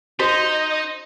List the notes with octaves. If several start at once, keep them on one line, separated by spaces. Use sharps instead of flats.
D#4 F#4 C5 D#5